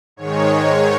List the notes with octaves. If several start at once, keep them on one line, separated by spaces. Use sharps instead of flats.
G#2 D#3 G#3 C#5
C#5